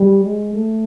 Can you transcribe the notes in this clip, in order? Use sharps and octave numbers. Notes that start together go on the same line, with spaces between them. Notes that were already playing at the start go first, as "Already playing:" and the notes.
Already playing: G3
G#3
A3